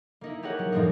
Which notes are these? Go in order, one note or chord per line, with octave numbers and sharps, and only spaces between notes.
A#3 D#4 E4
G4 G#4 A#4 C#5 F#5
F#3
F#2 A2 F3 G3 A#3 D#4